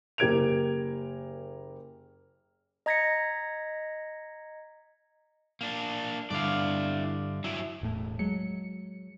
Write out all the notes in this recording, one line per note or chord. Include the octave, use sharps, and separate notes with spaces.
F#1 G4 A#4 G#6 D7 F7
D#5 A#5 G#6 A#6 B6 C#7
A#3 D4
G2 D3 E4 D5 F5
F#3 E4
E1 A2 A3
F#3 G#3 C#7